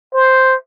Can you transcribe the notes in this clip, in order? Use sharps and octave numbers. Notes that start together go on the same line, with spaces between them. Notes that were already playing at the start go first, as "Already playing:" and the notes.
C5